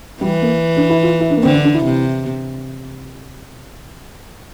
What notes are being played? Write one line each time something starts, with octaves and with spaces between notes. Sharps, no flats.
E3 G3
A#3
D4
E4
F4
E4
D4
A#3
D3 C4
D4
D4
E4
C3